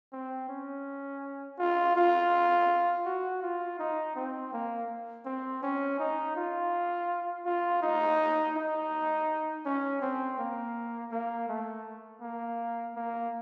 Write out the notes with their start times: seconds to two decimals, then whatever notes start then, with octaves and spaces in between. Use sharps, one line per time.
0.13 C4
0.49 C#4
1.59 F4
1.96 F4
3.06 F#4
3.42 F4
3.79 D#4
4.16 C4
4.53 A#3
5.26 C4
5.63 C#4
5.99 D#4
6.36 F4
7.45 F4
7.82 D#4
8.56 D#4
9.66 C#4
10.02 C4
10.39 A#3
11.12 A#3
11.49 A3
12.22 A#3
12.96 A#3